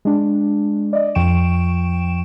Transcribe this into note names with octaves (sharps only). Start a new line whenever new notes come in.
G#3 D4
D5 D#5
F2 F3 G5 C#6 D7 E7